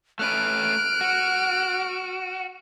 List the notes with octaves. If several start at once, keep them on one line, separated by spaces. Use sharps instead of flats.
A3 C#4 B4 F6 F#6 D7
F#4